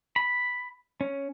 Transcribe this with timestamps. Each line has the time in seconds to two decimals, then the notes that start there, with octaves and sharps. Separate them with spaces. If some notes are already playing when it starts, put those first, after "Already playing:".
0.16 B5
1.01 C#4